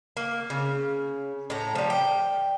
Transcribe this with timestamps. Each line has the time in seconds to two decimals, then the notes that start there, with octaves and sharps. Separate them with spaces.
0.17 A#3
0.50 C#3
1.50 A2 A#5
1.75 F3 G3
1.90 G5